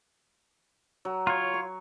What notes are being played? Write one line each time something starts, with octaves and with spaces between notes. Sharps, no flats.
F#3
F4 C#5 A#5
C#6